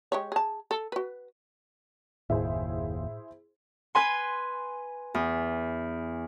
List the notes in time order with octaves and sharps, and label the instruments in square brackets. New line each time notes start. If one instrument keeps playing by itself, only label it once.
[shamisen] G#3 G4 C#5
G#4 A5
A4
F#4 B4
[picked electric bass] F#1 D#2 [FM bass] A2 [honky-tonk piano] E4 G#4 C5
[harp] B4 G#5 C6
E2